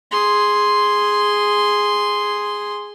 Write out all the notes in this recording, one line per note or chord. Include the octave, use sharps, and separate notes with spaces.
G#4 C6